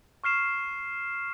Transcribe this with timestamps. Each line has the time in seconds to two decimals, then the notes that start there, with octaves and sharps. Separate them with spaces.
0.24 C#6 F6 C7 E7